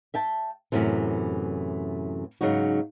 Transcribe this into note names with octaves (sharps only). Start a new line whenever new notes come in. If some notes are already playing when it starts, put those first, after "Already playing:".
E5 G5 A5
F#2 A2 C3 E3
G#2 C#3 F#3 B3 D#4 F#4